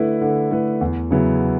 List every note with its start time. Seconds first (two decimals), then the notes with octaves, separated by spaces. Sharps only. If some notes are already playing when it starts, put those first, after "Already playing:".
Already playing: D3 A3 E4 B4
0.21 D3
0.51 A3 E4 B4
0.81 E2
1.11 C#3 F#3 B3 E4